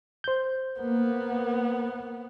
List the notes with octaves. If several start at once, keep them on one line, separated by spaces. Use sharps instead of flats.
C5 G6
A#3 B3